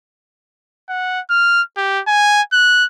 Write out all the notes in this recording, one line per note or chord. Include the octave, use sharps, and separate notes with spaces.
F#5
F6
G4
G#5
F#6